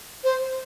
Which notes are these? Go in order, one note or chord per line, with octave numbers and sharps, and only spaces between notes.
C5